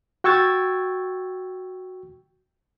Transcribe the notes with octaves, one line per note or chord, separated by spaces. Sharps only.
F#4 G5 C#6 E6 G#6 A6